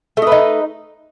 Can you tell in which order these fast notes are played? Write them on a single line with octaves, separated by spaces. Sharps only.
A3 D#5 B4 D#4